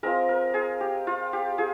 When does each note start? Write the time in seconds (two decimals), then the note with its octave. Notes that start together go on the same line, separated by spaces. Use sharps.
0.03 G#3 C4 F4 A#4
0.29 A#4
0.54 G#4
0.81 G4
1.07 F4
1.33 G4
1.58 F4 G#4